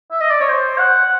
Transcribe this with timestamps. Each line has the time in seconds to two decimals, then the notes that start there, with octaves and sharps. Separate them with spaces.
0.12 E5
0.21 D#5
0.31 D5
0.40 C#5
0.49 C5
0.79 F#5